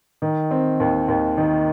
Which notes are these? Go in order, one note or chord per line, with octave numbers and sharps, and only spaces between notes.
D#3
C4
D#2
D#2
D#3